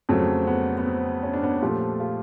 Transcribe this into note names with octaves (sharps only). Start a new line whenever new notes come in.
F2 C#3 F#3 A3 C4
B3
B3
C4
C#4
D4
B3 C#4
A#2 F3 A3 F4 G4
F4 G4